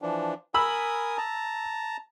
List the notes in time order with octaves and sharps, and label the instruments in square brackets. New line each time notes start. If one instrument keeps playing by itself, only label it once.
[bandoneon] E3 F3 D4
[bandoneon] A#4 G#5 D#6 [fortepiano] B5 E6
[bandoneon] A5 A#5